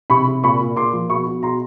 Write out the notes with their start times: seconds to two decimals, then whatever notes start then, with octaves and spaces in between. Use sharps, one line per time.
0.10 C3 B5 C#6
0.27 C3
0.43 A#2 B5 C#6
0.61 A#2
0.76 A#2 C6 D6
0.93 F3
1.09 B2 B5 C#6
1.27 B2
1.43 B2 A#5 C6